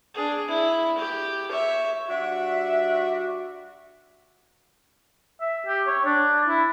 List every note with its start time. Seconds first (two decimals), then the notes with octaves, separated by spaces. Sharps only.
0.14 D4 G#4
0.48 E4
0.98 G4
1.50 C#5 E5
2.09 G3 D4 F#4 E5
5.41 E5
5.67 G4
5.87 C#5
6.05 D4
6.48 E4